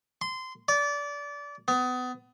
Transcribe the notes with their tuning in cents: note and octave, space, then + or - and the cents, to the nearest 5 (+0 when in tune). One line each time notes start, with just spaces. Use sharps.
C6 -20
D5 -25
B3 +30